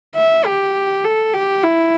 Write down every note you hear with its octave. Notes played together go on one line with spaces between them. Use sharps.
E5
G4
A4
G4
E4